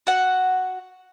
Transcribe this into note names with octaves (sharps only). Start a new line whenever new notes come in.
F#4 F#5